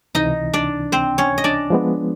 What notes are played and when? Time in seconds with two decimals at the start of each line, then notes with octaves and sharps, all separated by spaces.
0.15 C#2 C3 E3 D#4 D#5
0.53 D4 D5
0.92 C4 C5
1.18 C#4 C#5
1.38 D#5
1.44 D4 D5
1.70 F3 G#3 B3